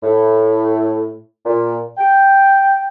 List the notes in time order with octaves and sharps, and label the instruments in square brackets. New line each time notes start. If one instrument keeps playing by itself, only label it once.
[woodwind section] A2
A#2
G5